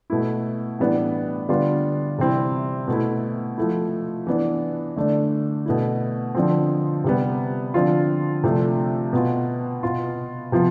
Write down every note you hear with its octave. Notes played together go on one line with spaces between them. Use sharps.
B2 A3 E4
A2 E3 G3 B3 D4
D3 G3 B3 D4 F4
C3 E3 G3 C4 E4
B2 A3 E4
F3 A3 E4
E3 B3 D4
D3 A3 D4
B2 A3 E4
D3 F3 C4
C3 G3 B3
D3 F3 C4 F4
C3 F3 A3 D4
B2 B3 F4
B2 B3 F4
C3 F3 B3 F4